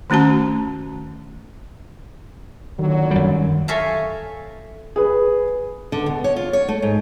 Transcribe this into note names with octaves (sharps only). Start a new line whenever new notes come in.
D#3 A3 C#4 F#4 A5
A#2 D3 D#3 F#3
F#2 G3
A4 C#5 E5 F5 G#5 A#5
G#4 B4
D3
B2
C#5
F4
C#5
A3
G#2